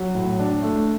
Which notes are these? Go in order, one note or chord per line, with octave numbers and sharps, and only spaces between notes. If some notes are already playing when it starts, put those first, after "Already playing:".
Already playing: F#3
A2
D4
A3